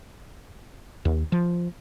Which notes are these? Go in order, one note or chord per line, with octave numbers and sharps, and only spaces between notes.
D#2
F3